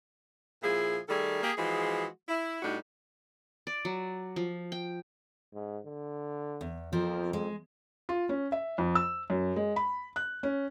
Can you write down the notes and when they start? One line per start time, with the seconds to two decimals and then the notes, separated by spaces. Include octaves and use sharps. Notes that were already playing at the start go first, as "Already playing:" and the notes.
0.62 A#2 F3 E4 G#4
1.09 D#3 G3 A3 G#4 A4
1.43 A#3 G4 G#4
1.56 E3 F3 G#3 F#4 G#4
2.29 E4
2.62 A2 G3 D4 D#4 F#4
3.67 D5
3.85 F#3
4.36 F3
4.72 G5
5.54 G#2
5.86 D3
6.61 E2
6.93 F2 F3 C4 A#4
7.33 G#3
8.09 F4
8.29 C#4
8.52 E5
8.78 F2
8.95 E6
9.30 F#2
9.56 G#3
9.76 B5
10.16 F#6
10.43 C#4